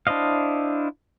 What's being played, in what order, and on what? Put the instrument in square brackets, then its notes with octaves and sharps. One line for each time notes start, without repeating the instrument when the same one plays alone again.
[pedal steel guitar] D4 E4 C5 D#5 F5